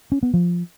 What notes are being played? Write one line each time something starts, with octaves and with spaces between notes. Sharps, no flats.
C#4
B3
F3